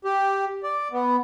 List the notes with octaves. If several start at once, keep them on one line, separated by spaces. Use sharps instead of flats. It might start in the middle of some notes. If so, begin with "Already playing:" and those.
G4
D5
B3